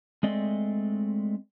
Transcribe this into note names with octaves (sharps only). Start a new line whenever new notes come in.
G#3 A3 C4 D5 D#5